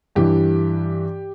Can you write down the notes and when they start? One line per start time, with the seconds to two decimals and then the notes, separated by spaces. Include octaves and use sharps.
0.16 G2 E3 G4